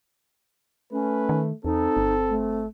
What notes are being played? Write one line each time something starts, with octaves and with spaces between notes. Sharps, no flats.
A3 C#4 B4
D#3
E2 C4 D#4 A4
G1
A3